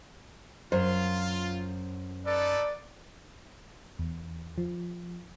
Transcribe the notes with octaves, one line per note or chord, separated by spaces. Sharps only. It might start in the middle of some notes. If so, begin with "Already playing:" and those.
F#2 F4 C5
D#4 A4 B4 D5
E2
F3